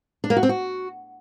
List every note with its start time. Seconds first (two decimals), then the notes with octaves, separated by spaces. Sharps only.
0.24 D4
0.30 A#3
0.36 F#4
0.43 C4
0.49 F#4